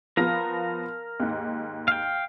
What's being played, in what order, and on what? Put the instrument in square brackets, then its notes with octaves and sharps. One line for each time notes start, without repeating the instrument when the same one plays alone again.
[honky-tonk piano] F3 B3 [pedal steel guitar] A#4 F5 A#5
[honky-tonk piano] D#2 G#2
[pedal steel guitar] F5 G5